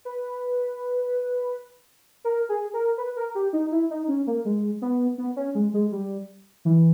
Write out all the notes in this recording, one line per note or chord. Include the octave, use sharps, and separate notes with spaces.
B4
A#4
G#4
A#4
B4
A#4
G4
D#4
E4
D#4
C#4
A#3
G#3
B3
B3
C#4
G#3
G#3
G3
E3